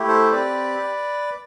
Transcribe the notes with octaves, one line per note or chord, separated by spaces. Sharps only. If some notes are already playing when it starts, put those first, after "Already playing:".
Already playing: A3 E4 G4
A4 C5
C4 G4 B4 D5